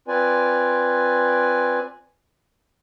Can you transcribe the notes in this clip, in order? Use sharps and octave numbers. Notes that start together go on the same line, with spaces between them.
C4 F4 B4 D5 G#5